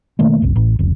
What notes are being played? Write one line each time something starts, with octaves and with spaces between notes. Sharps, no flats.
B2 D#3 A3 A#3
F#1 C2
A1
F1 C#2